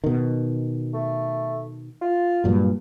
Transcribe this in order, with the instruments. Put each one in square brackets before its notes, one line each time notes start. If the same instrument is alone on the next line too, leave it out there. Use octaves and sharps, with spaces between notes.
[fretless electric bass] B2 D#3
[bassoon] A3
F4
[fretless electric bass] G2 A#2 F#3